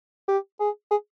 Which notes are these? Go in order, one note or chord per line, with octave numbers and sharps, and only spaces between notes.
G4
G#4
G#4